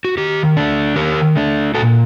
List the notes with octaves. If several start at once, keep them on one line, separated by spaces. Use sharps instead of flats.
F#4
D#3 G4
A3 D4
D#3 G4 A#4
A3 D4
A#2 F#4 A4